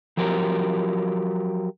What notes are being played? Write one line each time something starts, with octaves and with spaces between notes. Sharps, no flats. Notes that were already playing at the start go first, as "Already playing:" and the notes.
F3 F#3 G4 A#4